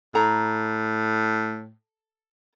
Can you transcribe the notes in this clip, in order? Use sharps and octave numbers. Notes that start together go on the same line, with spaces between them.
A2 A4 A#5